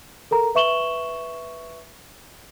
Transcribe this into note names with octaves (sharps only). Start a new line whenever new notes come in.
A4 A#4 A#5
B4 E5 C#6 E7 F#7 G7